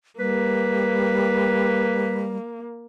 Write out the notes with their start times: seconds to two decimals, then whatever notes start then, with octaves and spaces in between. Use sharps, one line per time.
0.19 G3 A#3 B4